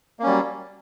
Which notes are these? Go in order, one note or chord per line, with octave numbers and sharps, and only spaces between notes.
F#3 G3 A#3 C#4